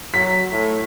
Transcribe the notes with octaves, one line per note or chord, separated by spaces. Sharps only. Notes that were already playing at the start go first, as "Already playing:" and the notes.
F#3 B6
A2